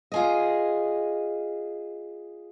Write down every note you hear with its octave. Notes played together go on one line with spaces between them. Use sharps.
F4 G#4 D#5